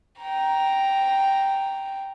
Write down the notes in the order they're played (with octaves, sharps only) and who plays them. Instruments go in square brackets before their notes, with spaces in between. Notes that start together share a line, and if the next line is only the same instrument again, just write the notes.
[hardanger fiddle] G5 A#5